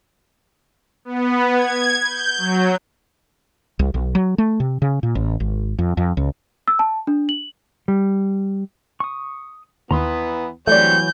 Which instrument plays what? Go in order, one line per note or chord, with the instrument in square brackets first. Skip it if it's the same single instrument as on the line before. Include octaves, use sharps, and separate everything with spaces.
[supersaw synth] B3
G#6
G6
F#3
[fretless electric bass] C2
B1
F#3
A3
C3
C#3
A#2
A1
G#1
F2
F2
C#2
[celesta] E6
A5
D4
F#7
[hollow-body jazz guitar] G3
[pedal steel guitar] C#6 D#6
[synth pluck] D#2 [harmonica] E3 B3 [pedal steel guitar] A#5 C6 D#6
[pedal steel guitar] E3 F#3 [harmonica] G3 C4 C#5 [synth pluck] A3 D5 [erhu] G6